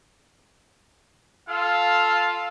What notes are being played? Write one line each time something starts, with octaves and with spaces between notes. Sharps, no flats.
F4 A4 F5